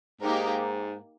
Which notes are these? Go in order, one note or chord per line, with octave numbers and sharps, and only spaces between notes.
G#2 A#3 D#4 G4 A#4